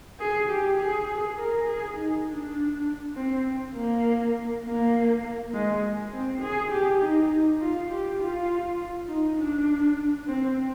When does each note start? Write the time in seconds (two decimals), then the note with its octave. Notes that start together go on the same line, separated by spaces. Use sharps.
0.19 G#4
0.49 G4
0.79 G#4
1.38 A#4
1.67 G#4
1.96 D#4
2.27 D4
3.15 C4
3.74 A#3
4.64 A#3
5.53 G#3
6.12 C4
6.41 G#4
6.71 G4
7.01 D#4
7.61 F4
7.90 G4
8.19 F4
9.08 D#4
9.37 D4
10.27 C4